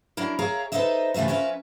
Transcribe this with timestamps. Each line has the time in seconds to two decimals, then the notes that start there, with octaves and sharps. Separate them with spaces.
0.17 F#3 D4 E4 A#4
0.39 G#4 A#4 C#5 E5 F5 A#5
0.72 D#4 A4 B4 C5 D#5 E5
1.14 C3 E3 A3 F4 E5
1.28 F3 C#4 A#4 B4 E5